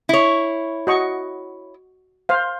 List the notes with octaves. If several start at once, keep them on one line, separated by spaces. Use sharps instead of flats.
E4 C#5
F#4 D#5 C#6
C5 F5